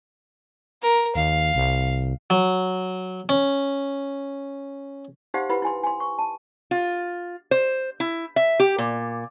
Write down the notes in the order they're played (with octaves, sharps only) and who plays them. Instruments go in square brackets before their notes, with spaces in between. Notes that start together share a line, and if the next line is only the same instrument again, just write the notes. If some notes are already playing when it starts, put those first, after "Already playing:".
[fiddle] A#4
[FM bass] D#2 [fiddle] F5
[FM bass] C2
[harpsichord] F#3
C#4
[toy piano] D#4 G4 C5 F5 F#5 C6
E4 G4 B4 F#5 B5
E4 G#5 C6
G#5 C6
C#6
A5
[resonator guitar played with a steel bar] F4
C5
E4
E5
G4
A#2